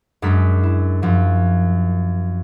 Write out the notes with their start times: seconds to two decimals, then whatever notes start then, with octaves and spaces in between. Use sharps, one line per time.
0.22 F#2 G#3 D4 A#4 B6
0.63 E4
1.02 F#2 F3